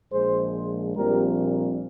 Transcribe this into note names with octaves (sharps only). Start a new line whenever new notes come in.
A#1 A#2 G#3 G#4 C5
A#1 A#2 G3 C4 G4 A#4